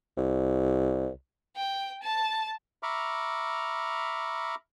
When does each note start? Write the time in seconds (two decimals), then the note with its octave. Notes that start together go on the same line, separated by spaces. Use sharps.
0.18 C2
1.56 G5
2.02 A5
2.83 E5 A#5 B5 C#6 D6 F6